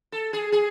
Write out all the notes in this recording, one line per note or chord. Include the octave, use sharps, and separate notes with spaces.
A4
G#4
G#4